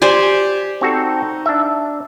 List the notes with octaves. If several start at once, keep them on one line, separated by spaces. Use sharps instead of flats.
G4 C5 D5 G#5
C4 D#4 F#4 A4
D4 E5